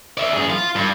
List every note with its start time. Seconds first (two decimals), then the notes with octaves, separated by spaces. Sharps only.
0.17 D5 E5
0.33 F#2 G#4
0.50 F4
0.75 G2